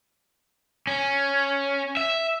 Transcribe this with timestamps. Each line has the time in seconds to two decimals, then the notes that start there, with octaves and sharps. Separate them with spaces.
0.87 C#4
1.97 E5